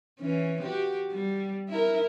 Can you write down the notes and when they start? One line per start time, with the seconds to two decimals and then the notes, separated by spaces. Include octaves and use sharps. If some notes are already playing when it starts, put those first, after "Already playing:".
0.20 E3 C#4
0.63 F#4 G4
1.10 G3
1.69 E4 A#4